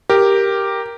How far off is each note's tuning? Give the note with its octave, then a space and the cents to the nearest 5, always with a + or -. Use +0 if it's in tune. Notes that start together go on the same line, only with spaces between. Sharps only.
G4 +0 A#4 +0